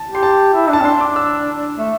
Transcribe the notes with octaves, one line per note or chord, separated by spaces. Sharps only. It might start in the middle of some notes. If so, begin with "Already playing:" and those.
Already playing: A5
G4
C6
A5
E4
D4 A5
C4
D4 C6
D6
E6
A3